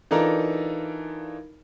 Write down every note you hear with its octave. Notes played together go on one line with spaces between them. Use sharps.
E3 D4 D#4 F4 A4 A#4